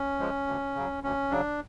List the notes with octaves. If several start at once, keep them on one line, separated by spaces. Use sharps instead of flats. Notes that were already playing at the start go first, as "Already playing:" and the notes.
Already playing: C#4
F3 G#3
D2
C#3 F#3
D2 C#4
C#3 F#3 D4